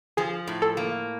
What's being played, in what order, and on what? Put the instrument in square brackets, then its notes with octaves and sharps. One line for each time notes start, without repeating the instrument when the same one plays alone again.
[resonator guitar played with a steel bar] F3 [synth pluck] G#4
[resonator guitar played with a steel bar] A2
[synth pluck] A4
[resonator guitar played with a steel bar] A#3